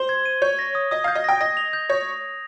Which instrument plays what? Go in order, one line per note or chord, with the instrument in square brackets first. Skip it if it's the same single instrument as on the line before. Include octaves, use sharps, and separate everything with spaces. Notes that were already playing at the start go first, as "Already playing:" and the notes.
Already playing: [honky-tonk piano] C5 [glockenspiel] G7
[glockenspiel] G#6
D#7
[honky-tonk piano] C#5 [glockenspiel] G6
[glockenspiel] A#6
D#6
[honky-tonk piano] D#5 [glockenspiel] D#6
[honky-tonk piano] F5 [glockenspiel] G6
[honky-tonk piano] D#5
[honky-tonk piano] G5 [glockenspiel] A#6
[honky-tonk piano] D#5 [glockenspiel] A#6
[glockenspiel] F7
G6
[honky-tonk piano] C#5 [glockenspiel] G6